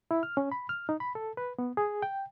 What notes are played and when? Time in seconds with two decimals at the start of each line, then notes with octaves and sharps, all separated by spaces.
0.11 E4
0.23 F6
0.37 C#4
0.52 B5
0.69 F6
0.89 D#4
1.00 B5
1.15 A4
1.37 B4
1.59 B3
1.77 G#4
2.02 G5